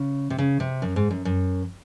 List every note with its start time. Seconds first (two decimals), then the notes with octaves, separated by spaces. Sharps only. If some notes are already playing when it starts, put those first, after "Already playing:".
Already playing: C#3
0.30 C3
0.38 C#3
0.60 C3
0.82 F#2
0.96 G#2
1.11 F#2
1.25 F#2